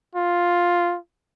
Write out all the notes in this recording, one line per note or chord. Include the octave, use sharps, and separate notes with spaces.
F4